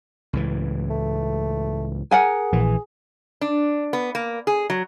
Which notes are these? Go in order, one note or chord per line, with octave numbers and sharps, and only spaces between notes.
C#2 A2 E3
A3
G#4 A#4 F#5 G#5
A#1 E3
D4
B3
A#3
G#4
F#3